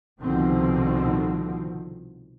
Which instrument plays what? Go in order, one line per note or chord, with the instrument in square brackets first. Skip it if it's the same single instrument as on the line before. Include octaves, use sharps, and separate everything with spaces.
[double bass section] C2 B2 D3 D#3 F3 C4